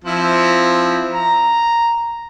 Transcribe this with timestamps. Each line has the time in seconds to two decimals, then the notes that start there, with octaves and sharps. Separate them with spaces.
0.04 F3 C4 E4
1.12 A#5